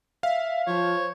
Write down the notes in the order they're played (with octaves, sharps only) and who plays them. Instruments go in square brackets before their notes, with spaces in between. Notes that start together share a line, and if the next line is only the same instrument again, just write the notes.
[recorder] E5 [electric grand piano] F5
[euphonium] F3 [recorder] C5 [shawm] C#5